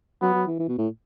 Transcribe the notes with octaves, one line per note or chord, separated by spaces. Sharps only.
F#3 B3
F#3
E3
E3
B2
A2